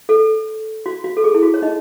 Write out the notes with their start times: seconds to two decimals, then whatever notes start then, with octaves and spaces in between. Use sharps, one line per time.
0.09 A4
0.86 F#4
1.04 F#4
1.17 A4
1.24 G#4
1.35 E4
1.43 F#4
1.54 C#5
1.62 D#4 D#5